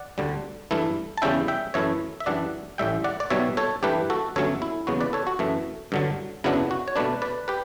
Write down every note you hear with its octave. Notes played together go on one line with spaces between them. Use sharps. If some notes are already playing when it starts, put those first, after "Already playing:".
Already playing: D5 F#5
D2 D3 G3
G2 E3 A3 E4
A5
E2 C#3 G3 C#4 E4 E5 G5
E5 G5
F#2 E3 A3 E4 C#5 E5
E5
F#2 E3 G3 D4 D5 F#5
A1 A2 G3 E5 G5
D5 F#5
D5
B1 B2 G3 C#5 E5
A4 C#5
G2 E3 A3 G4 B4
F#4 A4
G1 G2 F#3 A3 C#4 A4 C#5
E4
E2 C#3 F#3 B3 F#4
B4 D5
A4 C#5
F#4
F#2 E3 A3
G2 D3 F#3
F#2 C#3 F#3 B3 D4 E4
F#4
C#5
B2 A3 D4 B4 D5
B4 D5
G4 B4